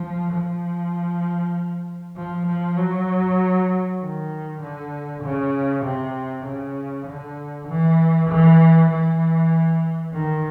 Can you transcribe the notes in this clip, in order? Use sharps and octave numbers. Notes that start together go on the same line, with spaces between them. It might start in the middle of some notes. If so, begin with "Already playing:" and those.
Already playing: F3
F3
F3
F3
F#3
D#3
D3
C#3
C3
C#3
D3
E3
E3
E3
D#3